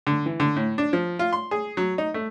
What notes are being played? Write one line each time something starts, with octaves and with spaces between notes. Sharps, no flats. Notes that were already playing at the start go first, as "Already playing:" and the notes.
D3
E3
D3
A2
D4
F3
F4
C6
G#4
F#3
D#4
A3